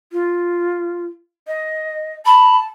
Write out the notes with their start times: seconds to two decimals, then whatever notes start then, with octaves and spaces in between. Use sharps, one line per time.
0.13 F4
1.47 D#5
2.26 A5 B5